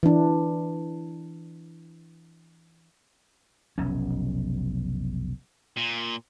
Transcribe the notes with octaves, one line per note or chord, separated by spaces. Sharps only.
E3 D4
F1 B1 C#4
A#2